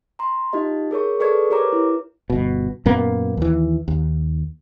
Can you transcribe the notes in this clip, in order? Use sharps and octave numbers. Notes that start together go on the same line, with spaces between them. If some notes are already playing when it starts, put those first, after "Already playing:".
A#5 C6
D#4 F4 G4 D#5
G#4 A#4 C#5 C#6
G#4 A4 B4 D5 C#6 G#6
G4 A#4 B4 C#5 A#5 D6
E4
G1 B2
F#2 A#2 A#3 B3
D#2 E3
D#2